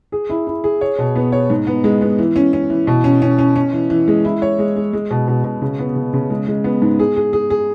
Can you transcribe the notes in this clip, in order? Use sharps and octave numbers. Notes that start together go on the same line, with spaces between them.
G#4
E4
E4
G#4
C#5
B2
B3
C#5
G#2
B3
G#3
B3
E3
C#4
C#4
E3
B2
C#4
C#4
C#4
C#4
E3
E3
G#3
E4
C#5
G#3
G#3
G#3
B2
B2
B2
C#3
B3
C#3
C#3
G#3
G#3
B3
G#2
G#4
G#4
G#4
G#4